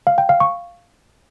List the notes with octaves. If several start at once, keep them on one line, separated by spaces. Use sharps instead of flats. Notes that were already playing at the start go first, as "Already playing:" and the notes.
F5
G5
F5
C#6